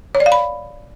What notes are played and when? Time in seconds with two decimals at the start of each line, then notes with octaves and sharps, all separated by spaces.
0.15 C#5
0.20 D5
0.26 F5
0.32 B5